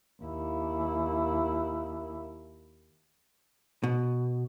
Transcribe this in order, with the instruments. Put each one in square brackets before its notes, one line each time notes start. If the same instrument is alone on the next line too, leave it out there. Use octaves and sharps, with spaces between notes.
[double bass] D#2 E4
[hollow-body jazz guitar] B2